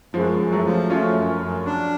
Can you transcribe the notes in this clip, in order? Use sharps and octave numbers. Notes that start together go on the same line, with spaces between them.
F#2 F3 G#3
F#2
F#3 A3
F3
A3 C#4 F4
F#2
F#2
D4